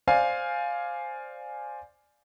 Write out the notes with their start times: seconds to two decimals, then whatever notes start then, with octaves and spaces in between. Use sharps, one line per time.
0.07 C5 D5 F5 G#5